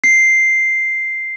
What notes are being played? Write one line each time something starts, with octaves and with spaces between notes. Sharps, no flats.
C7